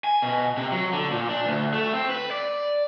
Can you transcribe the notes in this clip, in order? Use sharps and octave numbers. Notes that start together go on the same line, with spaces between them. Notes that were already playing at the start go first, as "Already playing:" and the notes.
G#5
B2
C3
F#3
D3
A#2
D4
D2
A3
C4
B4
D5